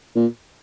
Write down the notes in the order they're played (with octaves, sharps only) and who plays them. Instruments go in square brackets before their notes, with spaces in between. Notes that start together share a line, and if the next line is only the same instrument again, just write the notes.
[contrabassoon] A#2